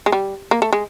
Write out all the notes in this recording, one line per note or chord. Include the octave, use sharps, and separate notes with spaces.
G#3
G3
A#3
A3
G#3